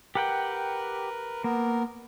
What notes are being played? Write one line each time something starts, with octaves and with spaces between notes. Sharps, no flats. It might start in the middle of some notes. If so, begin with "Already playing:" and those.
G4 A#4 B4 F#5 G5
A#3 B3 A#4